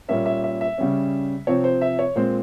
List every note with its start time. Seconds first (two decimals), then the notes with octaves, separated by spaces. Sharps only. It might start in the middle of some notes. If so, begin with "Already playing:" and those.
0.09 A#2 G3 A#3 C#4 E5
0.26 E5
0.44 E5
0.61 E5
0.78 C#3 G3 C#4
1.47 C3 F3 C4 C#5
1.64 C5
1.81 E5
1.99 C#5
2.15 A#2 G#3 C4 C5